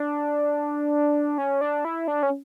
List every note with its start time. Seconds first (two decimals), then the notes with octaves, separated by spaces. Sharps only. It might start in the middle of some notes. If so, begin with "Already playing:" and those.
Already playing: D4
1.38 C#4
1.61 D4
1.85 E4
2.08 D4
2.23 C#4